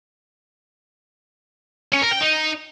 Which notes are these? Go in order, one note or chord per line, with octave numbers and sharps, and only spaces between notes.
C#4
A#4
G5
D#4